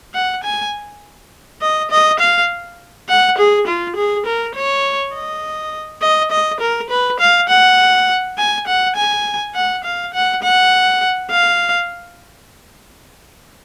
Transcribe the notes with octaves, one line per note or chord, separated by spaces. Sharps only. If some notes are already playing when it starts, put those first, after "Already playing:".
F#5
G#5
D#5
D#5
F5
F#5
G#4
F4
G#4
A#4
C#5
D#5
D#5
D#5
A#4
B4
F5
F#5
G#5
F#5
G#5
F#5
F5
F#5
F#5
F5